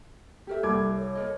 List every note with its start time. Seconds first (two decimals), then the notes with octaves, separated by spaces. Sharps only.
0.47 G4 A4 A#4 E5
0.63 C2 D6 G#6
0.95 C#5
1.15 A4 A#4 D#5